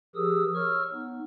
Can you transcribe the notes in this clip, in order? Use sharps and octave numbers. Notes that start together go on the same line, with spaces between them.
F3 G4 G#4 A#4 D#6 E6
C#5 C#6 E6 F6
B3 D#4